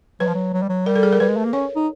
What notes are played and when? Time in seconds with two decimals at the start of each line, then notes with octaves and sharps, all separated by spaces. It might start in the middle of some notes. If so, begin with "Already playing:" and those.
0.20 F#3 B4
0.27 F3
0.34 F#3
0.53 F#3
0.62 G3
0.69 F#3
0.86 G3 A#4
0.96 A4
1.03 G#4
1.12 A#4
1.20 G3 B4
1.29 G#3
1.37 A3
1.45 A#3
1.53 C#4 C#5
1.76 D#4